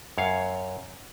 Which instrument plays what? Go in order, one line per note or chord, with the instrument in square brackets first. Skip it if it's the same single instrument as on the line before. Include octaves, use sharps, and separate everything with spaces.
[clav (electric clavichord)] F#2 C#5 F5